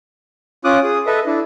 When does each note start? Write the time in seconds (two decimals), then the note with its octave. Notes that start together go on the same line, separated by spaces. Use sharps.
0.65 C#4 F4 D6 D#6 F#6
0.84 G#4 D#6
1.06 A4 B4 D#5 E5
1.26 D4 E4